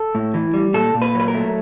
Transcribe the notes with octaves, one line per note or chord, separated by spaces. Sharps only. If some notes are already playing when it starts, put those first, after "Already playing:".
Already playing: A4
A2
E3
G3
A#2 A4
A#2
B4
F#3 B4
A#4
A3